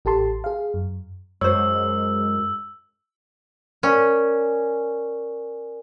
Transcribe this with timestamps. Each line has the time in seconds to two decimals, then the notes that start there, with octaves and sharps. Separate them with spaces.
0.05 A1 G4 A4 A5 C6
0.44 G#4 F5
0.74 F#2
1.41 F#2 G#3 C5 C#5 E6
3.83 C#4 A#4 D5 G#5